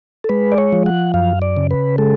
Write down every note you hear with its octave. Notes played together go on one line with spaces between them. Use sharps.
A4
G#3 B4
D5
C#5
F3
F#5
F#2 F5
D5
C#3
B4
G#3 A4